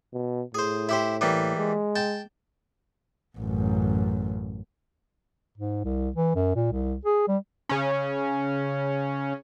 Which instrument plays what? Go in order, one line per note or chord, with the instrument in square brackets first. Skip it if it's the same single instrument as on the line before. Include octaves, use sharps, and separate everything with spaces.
[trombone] B2
[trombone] A2 [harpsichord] G#4 C5
[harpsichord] E4 G4 C5
E3 G3 A#3
[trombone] G#3
[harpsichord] G5 A5
[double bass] A1 F#2
[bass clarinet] G#2
C2
E3
F#2
A#2
C2
G#4
G3
[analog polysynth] C#3 C#4